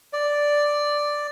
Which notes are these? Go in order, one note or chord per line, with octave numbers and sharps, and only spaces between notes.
D5